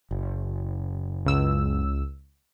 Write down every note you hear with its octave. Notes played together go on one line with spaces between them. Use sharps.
F#1
C#2 E6